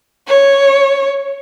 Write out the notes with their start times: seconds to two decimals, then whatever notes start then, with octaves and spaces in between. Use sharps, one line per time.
0.27 C#5